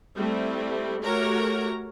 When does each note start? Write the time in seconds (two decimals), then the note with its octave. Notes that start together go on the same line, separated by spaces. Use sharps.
0.17 G3 A3 C4 E4
1.03 A3 F#4 G4 A#4 C#5 A#5